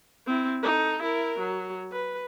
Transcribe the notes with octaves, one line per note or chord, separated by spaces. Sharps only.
C4 E4
D#4 A4
E4 A#4
F#3
B4